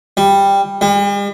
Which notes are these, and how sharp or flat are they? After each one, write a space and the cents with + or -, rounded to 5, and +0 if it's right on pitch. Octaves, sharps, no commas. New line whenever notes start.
G3 +10
G3 +45